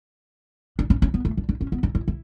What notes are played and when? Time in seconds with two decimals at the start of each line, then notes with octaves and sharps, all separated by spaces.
0.79 D4
0.90 C#4
1.02 C#4
1.14 B3
1.25 A3
1.37 D4
1.49 D4
1.61 C#4
1.72 B3
1.83 D4
1.95 E4
2.08 E4